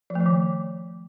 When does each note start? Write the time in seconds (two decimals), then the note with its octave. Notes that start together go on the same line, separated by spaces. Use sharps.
0.10 F3
0.15 A3
0.21 F3
0.26 D#3